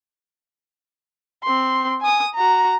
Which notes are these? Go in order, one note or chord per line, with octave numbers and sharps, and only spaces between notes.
C4 C6
G#5 D#6
F#4 A#5